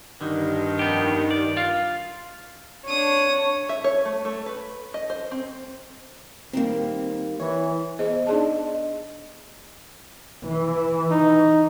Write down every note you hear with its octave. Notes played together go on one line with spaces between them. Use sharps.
G2 D3 D#3
F2 B3 G4
D5
F4 F5
D4 C#5 D#6
E5
C#5
A3
A3
B4
D#5
C5
C4
D#3 G3 A#3 C4
E3 C#5
B3 G#4 C5 D#5
D4 D#4 G#4 D5 D#5 A5
D#5
E3
D#4